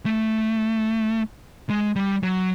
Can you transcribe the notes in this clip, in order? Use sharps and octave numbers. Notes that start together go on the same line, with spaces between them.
A3
G#3
G3
F#3